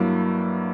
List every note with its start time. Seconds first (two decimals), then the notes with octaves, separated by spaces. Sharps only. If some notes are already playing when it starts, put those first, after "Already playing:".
Already playing: G2 F#3 A#3 E4